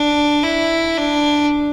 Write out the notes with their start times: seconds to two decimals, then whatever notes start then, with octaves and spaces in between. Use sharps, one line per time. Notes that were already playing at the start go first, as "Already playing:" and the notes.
Already playing: D4
0.43 E4
0.97 D4